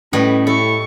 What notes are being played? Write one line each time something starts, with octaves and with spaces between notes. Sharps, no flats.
A2 G3 C#4 B4 D#5
A2 A4 C#6